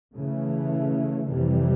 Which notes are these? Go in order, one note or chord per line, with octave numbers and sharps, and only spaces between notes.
C#3 E3 A3
F2 C3 E3 G3